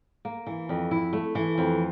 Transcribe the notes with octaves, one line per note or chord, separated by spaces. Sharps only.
A#3
E3
F2
E4
A3
E3
F2